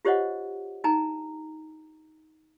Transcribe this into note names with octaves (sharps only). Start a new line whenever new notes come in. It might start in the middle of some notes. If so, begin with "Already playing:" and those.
F4 G4 C5 C#5 D#5 F#5
D4 D#4 G#5 A#5